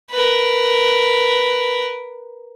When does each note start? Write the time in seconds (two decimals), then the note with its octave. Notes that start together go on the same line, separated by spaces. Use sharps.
0.11 A#4 B4